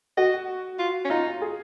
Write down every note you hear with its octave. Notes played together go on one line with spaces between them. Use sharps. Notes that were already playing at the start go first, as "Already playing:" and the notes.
F#4 D#5
F4
C#4
D#4 F4
G#4